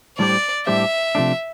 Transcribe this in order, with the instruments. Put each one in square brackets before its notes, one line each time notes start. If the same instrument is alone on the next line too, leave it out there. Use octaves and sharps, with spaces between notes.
[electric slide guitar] A2 G3 D4 G4 C5 [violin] D5
[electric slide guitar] A2 G3 D4 G4 C5 [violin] E5
[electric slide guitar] C3 F3 A3 D4